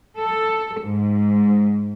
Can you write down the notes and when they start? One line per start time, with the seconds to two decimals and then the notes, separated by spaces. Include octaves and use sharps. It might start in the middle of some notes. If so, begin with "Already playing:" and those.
0.17 A4
0.82 G#2